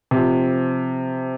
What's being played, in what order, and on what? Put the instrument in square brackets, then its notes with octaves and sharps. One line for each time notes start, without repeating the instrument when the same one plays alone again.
[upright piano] C3 F3